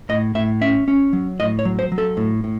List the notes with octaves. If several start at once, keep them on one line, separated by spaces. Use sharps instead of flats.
A2 D#5
A2 E5
C#4 E5
C#4
F#3
A2 D#5
C#5
F#3
C5
F#3
A4
A2
A2